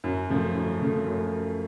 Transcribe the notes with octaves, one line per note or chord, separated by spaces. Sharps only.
F#2
C#3 F3 A3
F#2
C#3 F3 A3
F#2